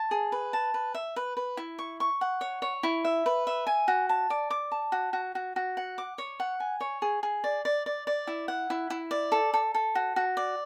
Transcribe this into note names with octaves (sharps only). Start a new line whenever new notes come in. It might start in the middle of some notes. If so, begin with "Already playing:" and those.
Already playing: A5
G#4
B4
A5
B4
E5
B4
B4
E4
C#6
C#6
F#5
C#5
C#5
E4
E5
B4
E5
G#5
F#4
A5
D5
D6
A5
F#4
F#4
F#4
F#4
F#5
D6
C#5
F#5
G#5
C#5
G#4
G#4
D5
D5
D5
D5
E4
F#5
E4
E4
D5
A4
A4
A4
F#4
F#4
D5